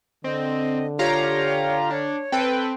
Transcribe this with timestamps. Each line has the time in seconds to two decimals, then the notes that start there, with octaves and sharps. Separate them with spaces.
0.24 D3 C4 D#5
0.99 F4 G4 C#5 F5 A#5
1.91 D4 C#5
2.32 C4 A4 B4 G5